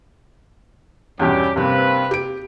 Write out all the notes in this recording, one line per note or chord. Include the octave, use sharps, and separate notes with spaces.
E2 G2 B2 G3 C#4 G4
G2 C3 A#3 C4 B4
G4 D7